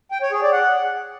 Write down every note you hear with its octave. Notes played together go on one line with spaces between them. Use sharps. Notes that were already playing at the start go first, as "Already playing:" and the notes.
G5
C#5
G#4
D5
F#5